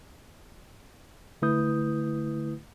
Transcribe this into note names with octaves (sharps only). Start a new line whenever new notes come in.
D3 A3 E4 B4 D#6 G6